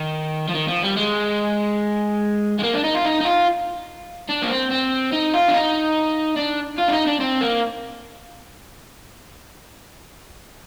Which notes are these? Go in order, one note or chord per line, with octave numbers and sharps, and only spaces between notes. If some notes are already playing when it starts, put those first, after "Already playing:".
Already playing: D#3
F3
D#3
F3
G3
G#3
G#3
A#3
D4
D#4
F4
D#4
D#4
F4
D4
A#3
C4
C4
D#4
F4
D4
D#4
D4
F4
D4
D#4
D4
C4
A#3